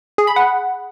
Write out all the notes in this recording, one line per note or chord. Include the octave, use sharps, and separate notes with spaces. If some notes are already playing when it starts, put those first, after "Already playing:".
G#4
B5
F#5